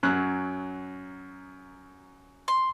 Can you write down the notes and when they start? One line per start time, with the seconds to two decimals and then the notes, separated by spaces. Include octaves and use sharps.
0.03 F#2 F#3 F#6
2.48 C6